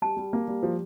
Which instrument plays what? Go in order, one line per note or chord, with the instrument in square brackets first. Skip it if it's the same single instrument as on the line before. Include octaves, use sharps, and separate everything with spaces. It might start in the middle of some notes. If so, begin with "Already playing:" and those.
[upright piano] G3 [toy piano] A5
[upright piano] G3
A#3
G3
F3